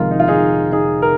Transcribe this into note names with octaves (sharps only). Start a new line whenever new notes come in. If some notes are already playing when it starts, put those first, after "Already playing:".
Already playing: F1 F2 D#3 G#3 F4 A#4
D#4
F4
D#4 G#4
D#4 G#4
A#4